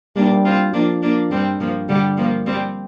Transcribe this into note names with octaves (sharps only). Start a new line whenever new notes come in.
G3 A#3 D4
C4 F4
F3 A#3 D4
A#3 D4
G2 G3 C4
G2 F3 A#3
D3 G3
F3 A#3
G3 C4